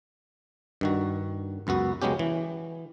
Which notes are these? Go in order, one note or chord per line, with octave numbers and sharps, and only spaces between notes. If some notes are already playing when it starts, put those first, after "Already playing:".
G2 D#3 F#4
C#2 F#2 B3 F#4
C#3 F#3 G#3 B3 C#4 G4
E3